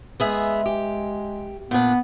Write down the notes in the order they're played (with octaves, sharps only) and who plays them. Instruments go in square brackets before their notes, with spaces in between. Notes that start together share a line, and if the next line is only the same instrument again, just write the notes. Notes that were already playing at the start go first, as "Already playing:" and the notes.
[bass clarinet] G#3 [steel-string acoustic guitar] B3 G#4 E5
[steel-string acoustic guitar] G4
[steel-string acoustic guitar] A#2 D4 [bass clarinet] B3